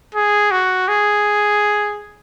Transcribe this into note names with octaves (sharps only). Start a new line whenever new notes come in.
G#4
F#4
G#4